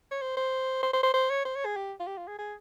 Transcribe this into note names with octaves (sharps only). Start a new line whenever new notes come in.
C#5
C5
C5
C5
C5
C5
C5
C#5
C5
C#5
G#4
G4
F4
G4
F4
G#4
G#4